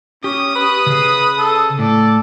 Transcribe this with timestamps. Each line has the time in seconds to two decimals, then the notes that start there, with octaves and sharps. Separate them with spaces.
0.24 C#4 G4 D#6
0.55 B4
0.86 C#3 G#4
1.38 A4
1.79 A2 A4 D5